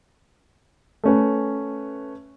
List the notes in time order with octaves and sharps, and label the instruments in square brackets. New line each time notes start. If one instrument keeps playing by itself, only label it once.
[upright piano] A3 C#4 B4